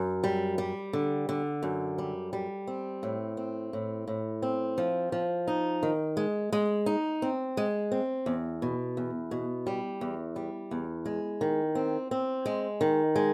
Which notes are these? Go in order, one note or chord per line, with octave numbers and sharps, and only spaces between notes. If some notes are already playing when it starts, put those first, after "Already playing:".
Already playing: F#2
G3
G3
D3
D3
F#2
G3
G3
C4
A2
C4
A2
A2
C4
F3
F3
D#4
D#3
G#3
G#3
D#4
C4
G#3
C4
E2
B2
E2
B2
G3
E2
G3
E2
G#3
D#3
C4
C4
G#3
D#3
G#3